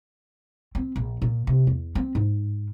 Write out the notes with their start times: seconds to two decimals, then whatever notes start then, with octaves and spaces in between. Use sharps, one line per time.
0.75 C4
0.96 A#1
1.22 A#2
1.47 C3
1.67 E2
1.95 C4
2.15 G#2